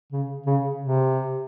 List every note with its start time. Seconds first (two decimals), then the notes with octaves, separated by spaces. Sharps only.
0.12 C#3
0.46 C#3
0.81 C3